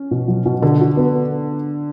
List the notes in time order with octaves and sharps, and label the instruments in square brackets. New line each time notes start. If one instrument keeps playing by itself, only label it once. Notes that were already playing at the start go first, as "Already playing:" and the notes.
Already playing: [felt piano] C#4
[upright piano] B2
F#3
B2
[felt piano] D3 [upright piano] A4
[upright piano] F#4
B3